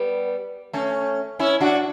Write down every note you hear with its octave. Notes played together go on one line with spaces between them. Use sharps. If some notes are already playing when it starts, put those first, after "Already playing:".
Already playing: G3 B3
A3 C#4
C#4 E4
D4 F#4